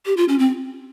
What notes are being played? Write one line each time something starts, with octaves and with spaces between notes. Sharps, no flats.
G4
F4
C#4
C4